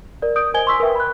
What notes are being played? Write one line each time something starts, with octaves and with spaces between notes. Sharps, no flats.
A#4 D5
D#6 G6 D7
A#4 C5 D#5 G#5 G#6 G7
C6 C#6 E6 B6
A#4 B4 E5 G5
B5 F#6